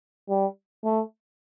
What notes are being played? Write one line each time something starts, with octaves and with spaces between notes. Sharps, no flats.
G3
A3